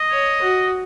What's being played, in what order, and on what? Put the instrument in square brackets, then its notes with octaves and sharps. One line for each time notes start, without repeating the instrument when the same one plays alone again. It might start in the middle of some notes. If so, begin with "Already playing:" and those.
Already playing: [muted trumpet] D#5
[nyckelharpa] C#5
F#4